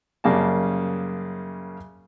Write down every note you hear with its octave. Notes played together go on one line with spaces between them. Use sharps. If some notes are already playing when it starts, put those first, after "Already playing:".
F#2 C#3 G3 A#3 D5 A5